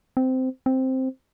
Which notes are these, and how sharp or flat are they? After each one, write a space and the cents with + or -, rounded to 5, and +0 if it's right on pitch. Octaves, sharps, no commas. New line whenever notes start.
C4 -15
C4 +0